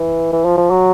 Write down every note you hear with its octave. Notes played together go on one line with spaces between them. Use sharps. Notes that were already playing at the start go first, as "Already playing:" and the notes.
Already playing: E3
E3
F3
F3
F#3